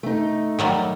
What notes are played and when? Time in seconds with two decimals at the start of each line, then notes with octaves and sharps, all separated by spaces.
0.03 A3 D#4
0.59 D#3 F#3 G3